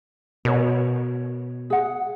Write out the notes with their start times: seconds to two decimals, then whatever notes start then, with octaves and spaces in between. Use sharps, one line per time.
0.45 B2 A#4 C#5
1.70 G#4 F#5